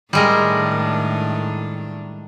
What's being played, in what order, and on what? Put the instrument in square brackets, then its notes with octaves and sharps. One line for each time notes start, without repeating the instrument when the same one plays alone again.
[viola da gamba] A2 D#3 D4 [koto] G3 G#3 A#4